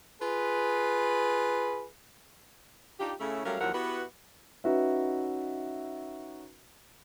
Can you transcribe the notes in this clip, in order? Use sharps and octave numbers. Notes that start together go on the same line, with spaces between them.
F4 G#4 B4
D4 D#4 F4 G4
C#3 A3 E4
F#3 G3 A3 C#4 A#4 F5
D#2 F3 F#3 E4 A#4 F#5
B3 E4 F#4 G4 B4
C#4 D#4 F#4 B4 E5